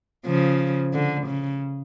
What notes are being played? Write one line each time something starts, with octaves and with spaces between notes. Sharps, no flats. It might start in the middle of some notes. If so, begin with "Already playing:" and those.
C#3 F3
D3
C#3